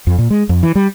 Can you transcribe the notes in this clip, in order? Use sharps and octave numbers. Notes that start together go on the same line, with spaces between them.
F2
A#2
G#3
F2
E3
G3